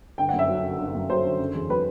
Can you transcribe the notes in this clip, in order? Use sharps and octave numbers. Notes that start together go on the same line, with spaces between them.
G1 G5
F#5
F#2
E5
F#3
D3
G1
F#2
F#3 C5
D3
F#1
E2
F#3 B4